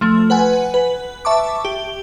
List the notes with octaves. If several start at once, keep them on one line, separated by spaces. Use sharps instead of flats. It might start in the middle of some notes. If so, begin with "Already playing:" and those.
F3 A3
B4 F#5 G#5
B4
E5 A5 C#6 D6
G4